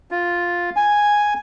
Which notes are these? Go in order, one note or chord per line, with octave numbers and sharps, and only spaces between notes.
F4
G#5